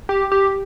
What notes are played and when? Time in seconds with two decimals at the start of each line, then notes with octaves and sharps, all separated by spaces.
0.09 G4
0.32 G4